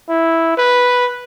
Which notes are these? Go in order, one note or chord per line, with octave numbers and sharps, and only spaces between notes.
E4
B4